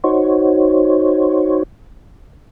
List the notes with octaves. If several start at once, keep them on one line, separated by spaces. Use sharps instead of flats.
D#4 F#4 C5 C#5